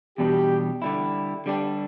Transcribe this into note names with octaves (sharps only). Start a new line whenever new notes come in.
E2 B2 G3 D4 G4
D3 G3 E4
D3 G3 D4 G4